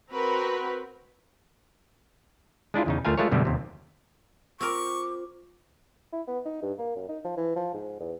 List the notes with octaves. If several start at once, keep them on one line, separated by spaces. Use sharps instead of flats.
C4 F#4 A#4 B4
G#3 D4 E4 F4
E2 C#3 D#4
D2 A3 F4 A#4 F5 G#5
G#3 A3 F4 A#4 C#5
F#2 B2 D3 G3 A3
D#2 C3
C4 F4 A#4 C5 C#6 D6
E4
B3
D#4
G2
A#3
F#2
D#4
F3
E3
F3
G#2
E2